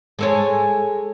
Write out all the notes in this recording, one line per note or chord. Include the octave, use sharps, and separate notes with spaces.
G#3 A4 C#5